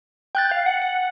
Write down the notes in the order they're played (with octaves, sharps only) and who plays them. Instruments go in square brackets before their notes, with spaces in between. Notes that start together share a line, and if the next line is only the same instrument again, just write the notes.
[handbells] G5 F#6 A6 [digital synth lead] G6
[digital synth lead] F5
F#5
F#5